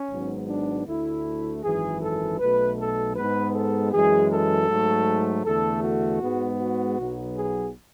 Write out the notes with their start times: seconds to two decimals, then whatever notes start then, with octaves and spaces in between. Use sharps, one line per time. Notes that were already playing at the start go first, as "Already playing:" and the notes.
Already playing: C#4
0.10 G#1 G#2 F#3 B3
0.49 D4
0.86 D2 D3 A3 E4
1.63 G#1 F#2 E3 G#4
2.01 A4
2.39 B1 B2 A3 B4
2.78 A4
3.16 G#2 G#3 B3 B4
3.54 A4
3.92 F#2 E3 G#3 G#4
4.30 A4
4.68 G#2 F#3 A3
5.44 E2 D3 A3 A4
5.82 F#4
6.21 G#2 G#3 B3
6.59 F#4
6.97 B1 B2 F#3 B3
7.35 G#4